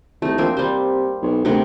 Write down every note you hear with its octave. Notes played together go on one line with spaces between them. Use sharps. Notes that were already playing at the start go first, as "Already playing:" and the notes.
C2 A3 D#4
A#1 A#3 C4
C3 G3 C5
B1
D2 C3 B3 A#4